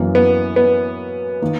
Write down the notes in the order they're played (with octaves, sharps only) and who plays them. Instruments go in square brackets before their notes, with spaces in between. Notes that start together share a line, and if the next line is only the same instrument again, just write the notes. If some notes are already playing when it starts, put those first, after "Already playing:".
Already playing: [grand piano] F#2 E3 A#3
[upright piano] B3
B3
[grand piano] D#3 A#3